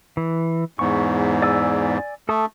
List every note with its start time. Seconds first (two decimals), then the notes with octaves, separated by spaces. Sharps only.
0.17 E3
0.79 E2 G#2 C#6
1.42 D5 G#5 E6
2.29 A3 A4 A5 D#6